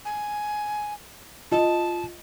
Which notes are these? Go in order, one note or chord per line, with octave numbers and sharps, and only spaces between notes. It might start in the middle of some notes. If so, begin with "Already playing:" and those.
G#5
F4 D#5 A5